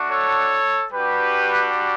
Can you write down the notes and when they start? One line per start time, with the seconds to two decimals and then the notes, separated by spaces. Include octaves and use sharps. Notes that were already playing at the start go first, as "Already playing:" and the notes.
Already playing: A3 D4 F#4
0.10 A4 C#5
0.93 G3 D4 F#4 G4 B4